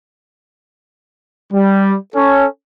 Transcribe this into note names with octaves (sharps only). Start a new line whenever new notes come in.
G3
C#4 A4